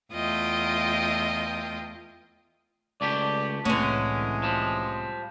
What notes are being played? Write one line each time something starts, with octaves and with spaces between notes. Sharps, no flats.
E2 A3 F4 D#5 G5
C#2 A3 G4 D5
C2 A2 D3 E3 G#3 C#4
F3 G3